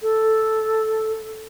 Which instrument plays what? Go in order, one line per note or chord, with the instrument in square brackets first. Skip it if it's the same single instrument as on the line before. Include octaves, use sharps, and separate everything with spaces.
[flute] A4